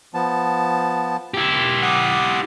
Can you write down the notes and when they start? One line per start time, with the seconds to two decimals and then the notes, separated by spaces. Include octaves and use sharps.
0.14 F3 B3 A5
1.34 E4 G4
1.82 F#5 D6 D#6